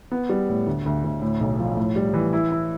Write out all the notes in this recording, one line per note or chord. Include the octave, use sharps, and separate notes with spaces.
B3
G3
A2
D2
D2
D2
A2
B1
F3
A2
G3
E3
E4
E4